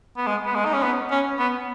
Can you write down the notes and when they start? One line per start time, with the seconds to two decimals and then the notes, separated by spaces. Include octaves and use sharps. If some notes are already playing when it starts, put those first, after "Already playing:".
0.17 B3
0.27 G#3
0.45 B3
0.55 G#3
0.66 D#4
0.74 C#4
0.83 B3
1.11 C#4
1.39 B3